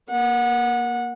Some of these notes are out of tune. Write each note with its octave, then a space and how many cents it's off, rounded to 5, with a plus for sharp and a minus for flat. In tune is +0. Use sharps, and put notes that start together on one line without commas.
A#3 +15 F#5 -20